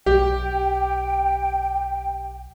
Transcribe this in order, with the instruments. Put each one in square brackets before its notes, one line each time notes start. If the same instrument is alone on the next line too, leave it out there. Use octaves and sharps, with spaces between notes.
[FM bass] B1 [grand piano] G4 [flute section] G5